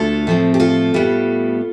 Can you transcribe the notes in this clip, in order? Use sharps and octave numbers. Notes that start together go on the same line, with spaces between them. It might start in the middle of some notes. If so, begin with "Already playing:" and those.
Already playing: D2 D3 A3 F4 A4
A2 F3 C4
G4
F4 A4
A2 G3 B3